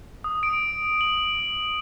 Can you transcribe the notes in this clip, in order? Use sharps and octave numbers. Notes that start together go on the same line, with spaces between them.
D#6
D7
F#7